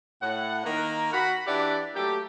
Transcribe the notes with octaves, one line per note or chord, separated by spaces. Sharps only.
A2 F#5
D#3 A#3 A#4
F#4 F#5 B5
E3 D4 G4 D5 E5 F#5
F#3 A3 A#3 G4